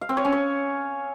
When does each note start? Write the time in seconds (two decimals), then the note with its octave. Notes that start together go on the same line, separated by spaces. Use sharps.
0.01 F5
0.09 C4
0.17 C#5
0.25 C#4
0.32 C#5